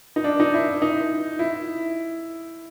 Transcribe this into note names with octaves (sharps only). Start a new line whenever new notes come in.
D#4
D4
D#4
E4
D#4
E4